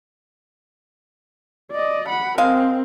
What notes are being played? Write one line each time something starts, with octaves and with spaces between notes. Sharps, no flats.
D5 D#5
F#5 B5
G#3 C4 A#4 F5